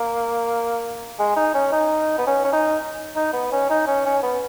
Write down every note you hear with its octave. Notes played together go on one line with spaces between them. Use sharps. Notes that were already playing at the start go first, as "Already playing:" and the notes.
Already playing: A#3
G#3
D#4
C#4
D#4
B3
C#4
C#4
D#4
D#4
B3
C#4
D#4
C#4
C#4
B3